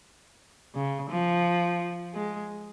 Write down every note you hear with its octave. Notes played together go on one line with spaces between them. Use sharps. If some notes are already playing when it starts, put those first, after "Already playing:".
C#3
F3
G#3